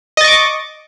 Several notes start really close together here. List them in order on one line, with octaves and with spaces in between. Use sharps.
D#5 A6 C#6 D6